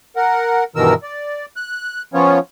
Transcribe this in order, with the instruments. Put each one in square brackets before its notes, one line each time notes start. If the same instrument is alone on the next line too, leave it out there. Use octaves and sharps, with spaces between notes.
[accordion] A#4 F#5
G2 B2 D#3 E3 A#4 E6
D5
F#6
F3 B3 C#4 F4 C#5